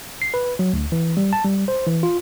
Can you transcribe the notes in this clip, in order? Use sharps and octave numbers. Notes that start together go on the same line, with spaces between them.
C7
B4
F#3
D2
E3
G3
A5
G3
C5
E3
F4